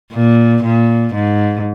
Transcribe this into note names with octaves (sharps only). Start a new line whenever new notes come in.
A#2
A#2
G#2